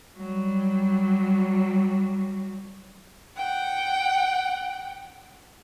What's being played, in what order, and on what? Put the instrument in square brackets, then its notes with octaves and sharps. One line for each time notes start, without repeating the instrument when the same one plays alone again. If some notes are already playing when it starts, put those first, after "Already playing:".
[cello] F#3 G3
[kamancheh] F#5 G5